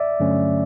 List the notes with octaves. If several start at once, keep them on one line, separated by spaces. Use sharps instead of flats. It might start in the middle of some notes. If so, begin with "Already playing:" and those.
Already playing: D5 E5
G2 D3 F#3 A3 C#4